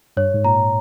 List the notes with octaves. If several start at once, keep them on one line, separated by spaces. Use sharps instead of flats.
G2 C#5
G#2
A#2 A#5